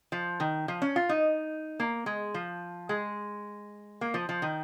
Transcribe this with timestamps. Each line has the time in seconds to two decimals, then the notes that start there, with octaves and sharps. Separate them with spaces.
0.12 F3
0.40 D#3
0.68 F3
0.82 C#4
0.96 F4
1.09 D#4
1.80 A#3
2.06 G#3
2.34 F3
2.89 G#3
4.01 A#3
4.14 F3
4.29 F3
4.42 D#3